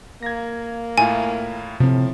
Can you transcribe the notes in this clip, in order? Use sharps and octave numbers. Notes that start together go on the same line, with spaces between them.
A#3 G#6 A#6
A2 E4 F4 G#5
A2 C3 F3 C4